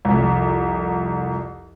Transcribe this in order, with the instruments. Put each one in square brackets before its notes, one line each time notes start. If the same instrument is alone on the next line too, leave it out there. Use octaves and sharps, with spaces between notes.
[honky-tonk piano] C2 F2